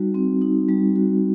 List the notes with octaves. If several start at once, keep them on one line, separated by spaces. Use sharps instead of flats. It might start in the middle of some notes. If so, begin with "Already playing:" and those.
Already playing: G3 D#4 F#4
C4
D#4
G3
F#4